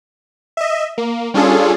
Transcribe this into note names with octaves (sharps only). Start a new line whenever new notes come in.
D#5 E5
A#3
G3 C#4 D4 F4 G#4 A4